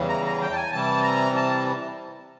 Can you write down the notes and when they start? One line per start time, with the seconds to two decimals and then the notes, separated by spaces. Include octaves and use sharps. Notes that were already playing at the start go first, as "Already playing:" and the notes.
Already playing: E2 C#3 E3 G3
0.09 A#5
0.25 A#5
0.41 G5
0.52 A5
0.57 G#5
0.72 C3 E3 G3 A5
1.03 A#5
1.35 A5